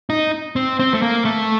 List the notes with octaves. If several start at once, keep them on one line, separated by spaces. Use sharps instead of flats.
D#4
C4
C4
A3
A#3
A3